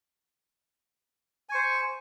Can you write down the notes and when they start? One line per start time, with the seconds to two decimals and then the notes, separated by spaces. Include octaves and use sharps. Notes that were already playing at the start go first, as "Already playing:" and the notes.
1.49 G#5
1.52 C#6
1.55 C5